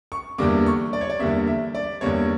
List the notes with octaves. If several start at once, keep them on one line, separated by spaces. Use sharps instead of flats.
C#6
E2 D3 G3 A#3 D6
C#6
D5
C#5
D5
E2 D3 G3 A#3 E5
E5
D5
E2 D3 G3 A#3 C#5